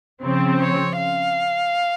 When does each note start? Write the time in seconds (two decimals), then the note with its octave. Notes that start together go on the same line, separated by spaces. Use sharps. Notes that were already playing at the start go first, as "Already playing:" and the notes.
0.23 C#3 F3 C4
0.60 C#5
0.97 F5